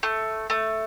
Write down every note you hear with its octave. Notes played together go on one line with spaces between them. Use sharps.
A3
A3